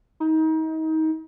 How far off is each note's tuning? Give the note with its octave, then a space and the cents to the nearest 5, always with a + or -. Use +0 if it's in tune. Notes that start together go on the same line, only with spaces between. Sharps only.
D#4 +30